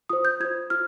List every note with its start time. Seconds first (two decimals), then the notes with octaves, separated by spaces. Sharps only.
0.09 F4 C5 D#6
0.25 G6
0.40 F4 C5 G#6
0.70 F4 F6